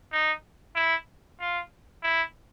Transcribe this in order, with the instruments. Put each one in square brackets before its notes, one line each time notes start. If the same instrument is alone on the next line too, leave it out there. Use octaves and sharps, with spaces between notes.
[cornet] D#4
E4
F4
E4